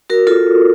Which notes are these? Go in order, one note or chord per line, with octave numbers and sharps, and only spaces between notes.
F#4 A#4
F4 A4